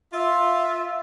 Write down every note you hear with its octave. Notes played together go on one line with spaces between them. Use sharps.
F4 E5